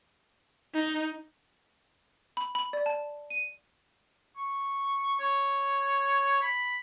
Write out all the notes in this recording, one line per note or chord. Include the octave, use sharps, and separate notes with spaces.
D#4
B5
B5
D5
A5
D#7
C#6
C#5
B5